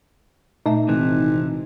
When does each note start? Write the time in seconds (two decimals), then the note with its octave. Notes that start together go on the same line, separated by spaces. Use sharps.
0.66 A#2 A3 D#4 E5
0.88 G#1 C3 E3